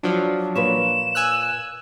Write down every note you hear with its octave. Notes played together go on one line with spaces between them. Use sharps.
F3 F#3 D4
A#2 B4 C#5 E7
G#5 E6 F#6